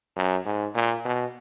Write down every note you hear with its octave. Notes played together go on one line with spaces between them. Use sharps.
F#2
G#2
A#2
B2